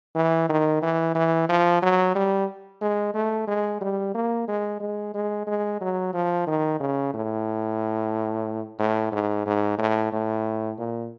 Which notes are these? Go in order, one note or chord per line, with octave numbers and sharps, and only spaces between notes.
E3
D#3
E3
E3
F3
F#3
G3
G#3
A3
G#3
G3
A#3
G#3
G#3
G#3
G#3
F#3
F3
D#3
C#3
A2
A2
G#2
G#2
A2
A2
A#2